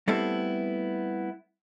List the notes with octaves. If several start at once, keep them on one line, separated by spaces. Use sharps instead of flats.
G3 A3 B3 C4 E4 A4